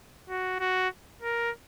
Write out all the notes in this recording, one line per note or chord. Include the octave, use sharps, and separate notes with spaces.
F#4
F#4
A#4